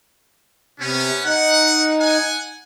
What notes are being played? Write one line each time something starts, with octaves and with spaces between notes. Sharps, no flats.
C3 B3 C#4
D#4 F#5
F#5 G#5